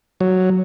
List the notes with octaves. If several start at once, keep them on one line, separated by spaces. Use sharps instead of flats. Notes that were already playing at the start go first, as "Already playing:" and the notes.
F#3